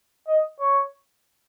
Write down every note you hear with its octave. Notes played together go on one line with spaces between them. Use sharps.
D#5
C#5